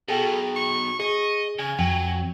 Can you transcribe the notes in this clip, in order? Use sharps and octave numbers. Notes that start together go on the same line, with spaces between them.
B2 F#3 G#4 A4 G5
C#6
G#4 D#5 C#6
C#3 G#5
F2 F#3 G5